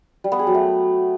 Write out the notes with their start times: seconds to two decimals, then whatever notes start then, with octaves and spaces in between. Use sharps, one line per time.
0.24 G3
0.32 B3
0.39 G#4
0.47 F#3
0.54 A3